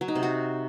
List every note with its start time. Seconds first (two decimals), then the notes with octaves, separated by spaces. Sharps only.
0.01 F#3
0.08 D#4
0.15 C3
0.23 F#4